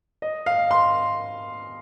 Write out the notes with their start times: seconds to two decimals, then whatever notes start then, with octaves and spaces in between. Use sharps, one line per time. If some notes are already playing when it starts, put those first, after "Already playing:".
0.22 D#5
0.46 F5
0.71 C6